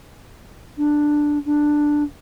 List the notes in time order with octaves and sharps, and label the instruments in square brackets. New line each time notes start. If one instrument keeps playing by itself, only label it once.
[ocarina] D4
D4